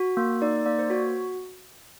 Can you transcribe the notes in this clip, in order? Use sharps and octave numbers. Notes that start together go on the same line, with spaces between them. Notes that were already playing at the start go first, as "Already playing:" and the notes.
Already playing: F#4
A#3
D#4 D5
A#3 D5
C5
F#4 C#5